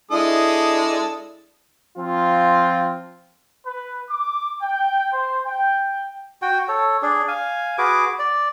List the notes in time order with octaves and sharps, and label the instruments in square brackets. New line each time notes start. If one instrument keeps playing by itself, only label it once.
[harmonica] G#3 A4 D#6 [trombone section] D4 E4
[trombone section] F3 C4 F4
[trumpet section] B4
D6
G5
C5
G5
[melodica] F#4 G5
A4 C#5
D4 G#4
F5 G#5
F#4 G#4 B4 D6
D5